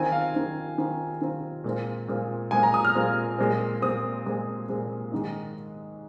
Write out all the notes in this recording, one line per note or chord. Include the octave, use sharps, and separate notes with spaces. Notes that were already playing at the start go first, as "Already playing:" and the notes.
Already playing: D#3 C4 F4 G#5
F5
D#3 C4 F4
D#3 C4 F4
D#3 C4 F4
A#2 G#3 C4 F4
A#2 G#3 C4 F4
A#2 G#3 C4 F4 G#5
A#5
D#6
F6
A#2 G#3 C4 F4
A#2 G#3 C4
A#2 G#3 C4 D#6
A#2 G#3 C4
A#2 G#3 C4
G#2 D#3 G#3